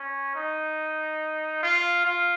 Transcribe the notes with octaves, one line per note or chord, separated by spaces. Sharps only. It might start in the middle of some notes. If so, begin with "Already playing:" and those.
Already playing: C#4
D#4
F4
F4